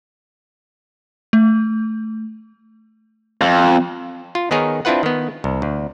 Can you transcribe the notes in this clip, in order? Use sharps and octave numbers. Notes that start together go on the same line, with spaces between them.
A3
F2
F4
D#3 B3 D#4 G#4 A#4 C#5
C4 D4 E4 F4 B4 F#5
D#3 B3
C2
D2